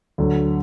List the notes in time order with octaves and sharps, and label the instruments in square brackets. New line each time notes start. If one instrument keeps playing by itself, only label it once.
[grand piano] D2 D3 F#3